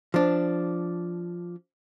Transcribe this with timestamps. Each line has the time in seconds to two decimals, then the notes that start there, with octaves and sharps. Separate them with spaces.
0.14 F3 D4